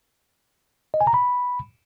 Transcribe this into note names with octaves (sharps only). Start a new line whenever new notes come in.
D#5
G#5
A#5
B5